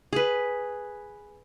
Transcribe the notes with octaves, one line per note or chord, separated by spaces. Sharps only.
G#4 B4